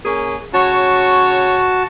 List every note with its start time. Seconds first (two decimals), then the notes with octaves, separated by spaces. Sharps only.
0.05 A#3 C#4 G#4
0.53 C#3 F#4 C#5 A5